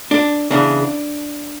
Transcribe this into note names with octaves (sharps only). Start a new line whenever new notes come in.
D4
C#3 E3 B3 D4